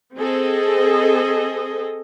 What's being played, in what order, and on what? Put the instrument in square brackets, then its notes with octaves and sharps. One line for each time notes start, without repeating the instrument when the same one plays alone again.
[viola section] C4 G#4 A4 D#5